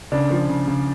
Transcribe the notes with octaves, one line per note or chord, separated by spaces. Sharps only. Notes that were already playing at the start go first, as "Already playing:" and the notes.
C#3 D4
F3
C#3
C#3